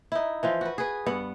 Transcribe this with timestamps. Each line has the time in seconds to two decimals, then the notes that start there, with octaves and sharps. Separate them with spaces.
0.12 D#4 E4
0.43 E3 F3 F4
0.61 F#4 B4
0.78 G#4 B4
1.06 G2 B3 F#5